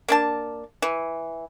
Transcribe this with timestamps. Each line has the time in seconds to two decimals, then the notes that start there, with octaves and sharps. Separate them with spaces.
0.08 A#3 D4 A5
0.82 E3